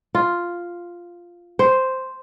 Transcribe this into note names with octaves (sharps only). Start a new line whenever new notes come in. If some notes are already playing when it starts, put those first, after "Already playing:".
F4
C5